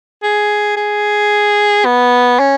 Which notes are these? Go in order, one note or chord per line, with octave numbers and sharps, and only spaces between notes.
G#4
G#4
B3
C#4